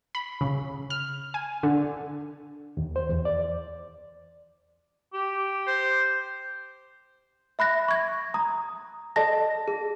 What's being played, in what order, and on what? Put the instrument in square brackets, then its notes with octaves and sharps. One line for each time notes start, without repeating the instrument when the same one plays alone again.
[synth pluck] B5
C#3
F6
G#5
D3
[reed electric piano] D#2
C5
E2
D5
[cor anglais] G4
[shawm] C5
[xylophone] E5 B5 F#6 A#6
C#6 G#6
A#5 D#6
A4 D5 D#5 A5 A#6
G#4